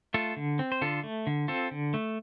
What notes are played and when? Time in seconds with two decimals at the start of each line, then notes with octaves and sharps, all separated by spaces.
0.14 A3 F4 A4
0.37 D3
0.59 C4
0.72 C5
0.81 D3 F4 A4
1.04 A3
1.27 D3
1.48 C4 F4 A4
1.71 D3
1.94 A3